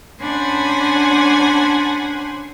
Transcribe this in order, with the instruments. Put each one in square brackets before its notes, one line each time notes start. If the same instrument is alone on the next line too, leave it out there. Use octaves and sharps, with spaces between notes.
[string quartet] C#4 D4 C5 F#5 G#5 B5